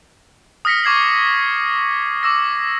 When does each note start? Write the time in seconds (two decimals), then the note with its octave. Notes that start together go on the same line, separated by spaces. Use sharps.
0.65 D#6 F6 A#6 B6 C#7
0.83 C#6 D6 G#6 C7 F#7
2.23 D6 E6 A#6